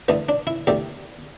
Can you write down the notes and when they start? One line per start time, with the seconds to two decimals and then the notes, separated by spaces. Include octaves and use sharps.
0.08 E2 D3 A3 B3
0.29 D4
0.47 E4
0.67 E2 D3 A3 G4